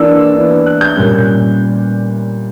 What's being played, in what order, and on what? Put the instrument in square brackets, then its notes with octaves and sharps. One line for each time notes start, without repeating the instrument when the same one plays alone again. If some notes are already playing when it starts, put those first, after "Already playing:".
Already playing: [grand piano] E3 A#3 D4 E6
E3 B3 D4
F#6
G6
A#2 G3 C#4